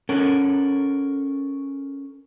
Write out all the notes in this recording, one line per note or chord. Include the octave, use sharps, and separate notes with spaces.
C#4 A4 A#4 F#5